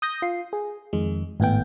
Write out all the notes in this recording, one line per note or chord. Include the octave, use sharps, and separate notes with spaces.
D#6 G6 A#6
F4 C7
G#4
F2 D#3 G#3
G#1 A2 B3 G5